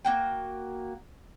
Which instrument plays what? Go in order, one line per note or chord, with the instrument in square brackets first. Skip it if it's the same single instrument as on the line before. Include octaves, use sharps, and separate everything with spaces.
[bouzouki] A#3 F#4 G5